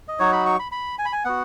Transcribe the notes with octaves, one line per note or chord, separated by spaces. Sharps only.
D#5
F#3 D#4 F#4 C#5
B5
C#6
B5
B5
G#5
B5
G#5
B3 F#4 F#5